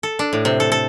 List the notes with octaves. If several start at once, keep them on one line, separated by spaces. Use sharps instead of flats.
A4
D4
A2
C3
A4
A4